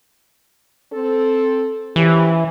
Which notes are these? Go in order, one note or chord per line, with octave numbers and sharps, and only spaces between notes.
C4 A4
E3 F3 C#4 G4